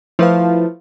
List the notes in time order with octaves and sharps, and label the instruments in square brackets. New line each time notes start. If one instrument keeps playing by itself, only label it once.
[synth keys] F3 A3 [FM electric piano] E4 B4 F5